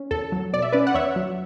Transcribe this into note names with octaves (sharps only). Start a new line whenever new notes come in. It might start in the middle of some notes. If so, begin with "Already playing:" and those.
Already playing: C#4
E2 A4
F#3
B2 D5
E5
C#4 B4 D5
F#5
E2 C#5 E5
F#3